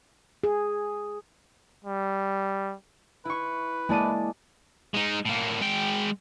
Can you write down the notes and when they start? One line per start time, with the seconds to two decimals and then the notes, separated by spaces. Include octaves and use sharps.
0.44 G#4
1.84 G3
3.25 E4 B4 C#6
3.89 G#3 A#3 E4 D5 A5 D#7
4.94 G#3 D#4
5.26 A2 A#3
5.61 G#3 G5